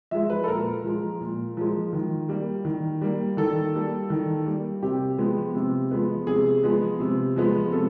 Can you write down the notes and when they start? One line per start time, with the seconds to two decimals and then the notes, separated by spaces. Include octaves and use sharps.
0.11 F3 G#3 E5
0.30 B4
0.44 A4
0.48 A#2 A#4
0.84 F3 G#3
1.21 A#2
1.57 F3 G#3
1.93 D#3
2.29 G3 A#3
2.65 D#3
3.01 G3 A#3
3.37 D#3 A4
3.74 G3 A#3
4.10 D#3
4.46 G3 A#3
4.83 C3 G4
5.18 F3 G#3 B3
5.55 C3
5.91 F3 G#3 B3
6.27 C3 G#4
6.63 F3 G#3 B3
7.00 C3
7.36 F3 G#3 B3
7.72 C3 A4